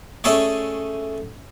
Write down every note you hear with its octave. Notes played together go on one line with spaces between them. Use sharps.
A3 C#4 G#4 A4 C#5 D5